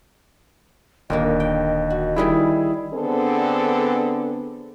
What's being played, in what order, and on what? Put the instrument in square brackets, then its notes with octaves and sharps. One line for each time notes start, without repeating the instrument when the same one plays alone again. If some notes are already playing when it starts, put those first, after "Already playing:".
[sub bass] D#1 [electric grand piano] D#2 [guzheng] A#2 D3 A#3 [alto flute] D#5
[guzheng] G5
F#4
[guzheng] D#3 G3 B4 [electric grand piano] E4 G#4
[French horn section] D3 B3 C4 D4 G#4 A4